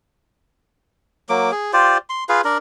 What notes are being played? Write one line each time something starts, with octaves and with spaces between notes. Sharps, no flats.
F#3 A#3 D6
G#4
F4 G4 C5 D5
C6
F4 G#4 B4 F5
D4 A#4